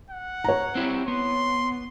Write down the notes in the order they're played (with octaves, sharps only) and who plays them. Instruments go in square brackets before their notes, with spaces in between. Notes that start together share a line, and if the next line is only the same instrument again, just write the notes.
[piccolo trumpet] F#5
[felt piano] C#5 A#5
[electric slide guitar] C4 E4 G4
[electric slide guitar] B3 [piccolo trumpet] C6